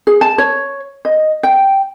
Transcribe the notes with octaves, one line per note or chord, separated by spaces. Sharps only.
G#4
A5
C#5
D#5
G5